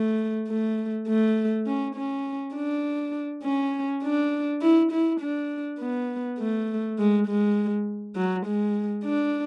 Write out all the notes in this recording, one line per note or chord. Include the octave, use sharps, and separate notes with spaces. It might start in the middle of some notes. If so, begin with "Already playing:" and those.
Already playing: A3
A3
A3
C#4
C#4
D4
C#4
D4
E4
E4
D4
B3
A3
G#3
G#3
F#3
G#3
D4